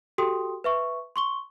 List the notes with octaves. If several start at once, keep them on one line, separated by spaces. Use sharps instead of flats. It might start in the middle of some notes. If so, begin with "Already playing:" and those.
F#4 G4 A4 G5 C6 D#6
B4 E5 C#6
C6 C#6 G7